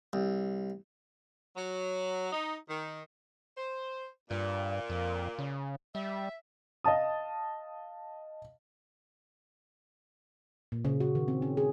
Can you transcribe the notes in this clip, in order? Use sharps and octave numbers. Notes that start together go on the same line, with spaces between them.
C2
F#3
D#4
D#3
C5
G2 A#2
F2
C#3
G3 E5
D#5 F5 A5 D#6
A#2
C#3
F#4
D#3
C4
C#4
G#4